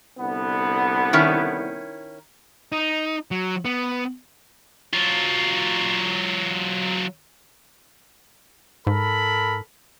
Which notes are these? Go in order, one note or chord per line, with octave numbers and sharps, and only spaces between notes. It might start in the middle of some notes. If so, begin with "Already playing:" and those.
C2 D3 B3
D#3 C#4 E4
D#4
F#3
B3
F#3 F4
G#2 A4 A#4 B5